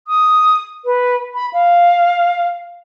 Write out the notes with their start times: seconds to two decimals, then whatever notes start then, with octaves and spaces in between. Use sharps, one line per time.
0.08 D#6
0.85 B4
1.34 B5
1.53 F5